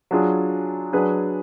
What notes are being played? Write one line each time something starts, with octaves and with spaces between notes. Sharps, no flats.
F#3 D4 F4 G#4
F#3 D4 G#4 B4